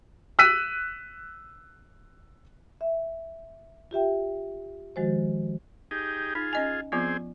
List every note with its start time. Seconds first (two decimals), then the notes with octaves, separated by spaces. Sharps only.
0.39 E6 F#6 B6 D#7
2.81 E5
3.91 F4 G4 E5 G5
4.96 D#3 F3 G#3 F#4 C5
5.91 D#4 G4 G#4
6.35 D#4 F4 G#4
6.53 C#4 D#5 G#5
6.92 F3 B3 C4 F4 G#4